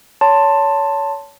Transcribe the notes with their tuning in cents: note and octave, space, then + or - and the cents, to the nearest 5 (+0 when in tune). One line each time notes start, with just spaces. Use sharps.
C#5 +25 A5 +10 C6 +5